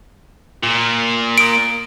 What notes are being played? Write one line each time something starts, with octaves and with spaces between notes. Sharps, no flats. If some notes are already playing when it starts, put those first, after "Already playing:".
A#2
D#6 D7